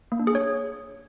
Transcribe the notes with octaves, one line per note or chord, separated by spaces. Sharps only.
A#3
D4
G#4
C#5